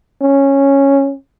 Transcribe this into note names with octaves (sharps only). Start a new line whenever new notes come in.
C#4